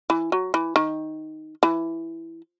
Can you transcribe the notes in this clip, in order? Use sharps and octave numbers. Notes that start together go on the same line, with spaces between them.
E3
F#3
E3
D#3
E3